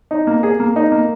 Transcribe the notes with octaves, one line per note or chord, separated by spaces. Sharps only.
D#4
A#3
G#4
A#3
D#4
A#3